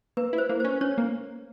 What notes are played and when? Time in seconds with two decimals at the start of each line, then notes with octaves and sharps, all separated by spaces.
0.17 A#3 B4
0.33 E4
0.38 C5
0.49 A#3
0.60 C#4 C5
0.81 C#4 C#5
0.98 A#3